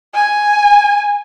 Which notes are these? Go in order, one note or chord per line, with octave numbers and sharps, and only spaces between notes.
G#5